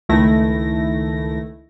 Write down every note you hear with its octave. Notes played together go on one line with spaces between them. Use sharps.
C#2 D#3 A3 E4 A#6